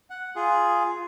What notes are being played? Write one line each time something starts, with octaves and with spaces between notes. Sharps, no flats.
F#5
F4 G#4